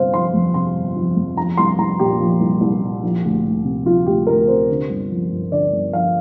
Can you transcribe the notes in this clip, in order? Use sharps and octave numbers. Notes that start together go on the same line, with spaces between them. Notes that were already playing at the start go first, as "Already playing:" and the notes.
Already playing: G1 C3 C5 F5
F3 C6
F2
C3 C6
G1
F3
F2
F3 A#5
C2 C6
C2 A#5
A#2 G4
F3
C2
C2
A#2
F3
D2
D2
C3
F3 F4
D2 G4
D2 A#4
C3 C5
D3
G1
F3
G2
D3 D5
G1
F3 F5